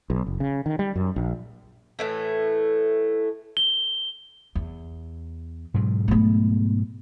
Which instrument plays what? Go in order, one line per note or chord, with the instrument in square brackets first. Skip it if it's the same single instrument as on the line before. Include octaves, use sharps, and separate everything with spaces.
[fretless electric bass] B1
F#1
C#3
D#3
G3
F#2
A#1
[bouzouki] A2 E3 A3
[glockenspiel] G7
[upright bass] E2
[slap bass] G#2 B2 F#3
[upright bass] A3 B3